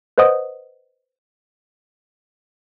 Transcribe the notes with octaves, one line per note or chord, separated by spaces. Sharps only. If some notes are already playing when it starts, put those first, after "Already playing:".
B4 C5 D#5 F#5 D#6